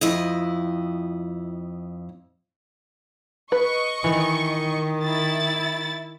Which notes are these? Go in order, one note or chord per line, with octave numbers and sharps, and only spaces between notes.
F2 E4 D#5
B4 D#5 C#6
D#3 E3
E4 A6